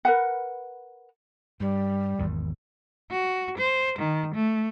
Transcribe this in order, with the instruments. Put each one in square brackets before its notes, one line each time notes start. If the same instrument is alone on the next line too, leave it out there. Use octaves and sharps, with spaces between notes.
[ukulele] A#4 B4 F#5
[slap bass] G2 [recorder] G3
[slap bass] G#1 E2 D#3
[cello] F#4
C5
D#3
A3